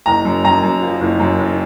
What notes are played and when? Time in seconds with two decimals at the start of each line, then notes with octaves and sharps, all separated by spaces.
0.06 F#1 A#5
0.25 F#2
0.44 F#2 A#5
0.63 F#2
0.82 F3
1.01 F#1
1.20 F#2
1.39 F#1